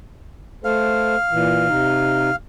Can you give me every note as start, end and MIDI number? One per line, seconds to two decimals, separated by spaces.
0.64 1.15 57
0.64 1.15 69
0.64 1.15 72
0.64 2.36 77
1.31 1.67 46
1.31 1.67 52
1.69 2.30 48
1.69 2.30 63